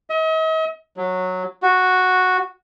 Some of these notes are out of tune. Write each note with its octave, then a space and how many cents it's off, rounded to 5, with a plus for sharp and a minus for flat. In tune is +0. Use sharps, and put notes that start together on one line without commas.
D#5 +45
F#3 -10
F#4 -5